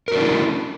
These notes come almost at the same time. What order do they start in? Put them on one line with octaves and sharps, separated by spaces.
A#4 F#4 D4 E4 C#4